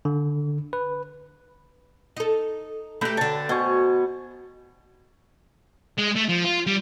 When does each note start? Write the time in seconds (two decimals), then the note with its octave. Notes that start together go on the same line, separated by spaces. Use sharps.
0.05 D3
0.73 B4
2.17 D#4 A4
3.01 A3 G4 B4 G5 A#5
3.17 D3 C#5 A5
3.49 B2 C5 G#5 C#6
5.98 G#3
6.15 A3
6.28 F3
6.45 F4
6.67 G3